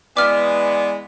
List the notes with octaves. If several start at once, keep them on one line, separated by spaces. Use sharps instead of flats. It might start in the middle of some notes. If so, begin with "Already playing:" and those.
E3 G#3 B3 D5 D6 F6